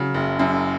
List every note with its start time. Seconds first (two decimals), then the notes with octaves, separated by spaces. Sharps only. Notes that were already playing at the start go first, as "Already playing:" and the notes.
Already playing: C#3 F#3
0.14 F#1
0.39 F#2